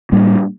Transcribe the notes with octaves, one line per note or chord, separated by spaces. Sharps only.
A2 G3 A#3 D4